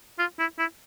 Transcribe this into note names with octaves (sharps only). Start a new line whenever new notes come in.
F4
E4
E4